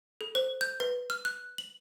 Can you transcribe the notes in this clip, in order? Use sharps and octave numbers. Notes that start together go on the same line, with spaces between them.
A4
C5
G6
B4
F6
F#6
F#7